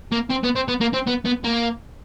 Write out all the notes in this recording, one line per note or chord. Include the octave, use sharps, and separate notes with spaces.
A#3
C4
B3
C4
B3
A#3
C4
B3
B3
A#3